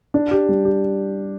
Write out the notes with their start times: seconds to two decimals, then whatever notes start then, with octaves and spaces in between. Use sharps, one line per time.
0.14 D4
0.31 G4
0.49 G3
0.65 G4